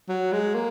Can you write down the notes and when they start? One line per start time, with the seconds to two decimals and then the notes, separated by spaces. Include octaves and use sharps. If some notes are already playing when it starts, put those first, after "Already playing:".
0.09 F#3
0.32 G#3
0.54 A#3